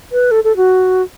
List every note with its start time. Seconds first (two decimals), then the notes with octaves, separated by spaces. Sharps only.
0.12 B4
0.31 A4
0.44 A4
0.57 F#4